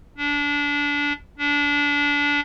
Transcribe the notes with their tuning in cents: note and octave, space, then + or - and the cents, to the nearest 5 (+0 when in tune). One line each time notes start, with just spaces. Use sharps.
D4 -25
D4 -25